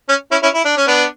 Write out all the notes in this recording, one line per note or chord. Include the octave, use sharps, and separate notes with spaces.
C#4
C#4 E4
C#4 E4
E4
D4
C#4
B3 D4